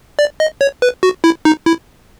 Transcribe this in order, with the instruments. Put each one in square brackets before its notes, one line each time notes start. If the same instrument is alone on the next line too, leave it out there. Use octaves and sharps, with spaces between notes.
[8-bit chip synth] D5
D#5
C#5
B4
F#4
E4
D#4
E4